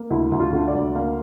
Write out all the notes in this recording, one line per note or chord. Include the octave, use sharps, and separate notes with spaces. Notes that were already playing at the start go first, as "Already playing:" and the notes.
Already playing: A#3
D2 E4
D2
F4
D3
D5
D2
A#3 F5